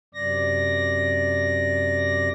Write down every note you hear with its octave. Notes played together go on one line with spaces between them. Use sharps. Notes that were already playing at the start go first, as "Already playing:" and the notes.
F#2 C3 D5 A#6